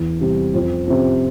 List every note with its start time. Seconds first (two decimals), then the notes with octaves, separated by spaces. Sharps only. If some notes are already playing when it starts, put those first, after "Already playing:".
Already playing: E2
0.21 C3 G3
0.54 F2
0.87 C3 F3